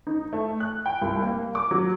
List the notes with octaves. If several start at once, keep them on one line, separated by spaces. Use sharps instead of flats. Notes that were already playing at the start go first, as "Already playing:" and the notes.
D#4
A3
F#6
G5
C2
A#3
D6
F#3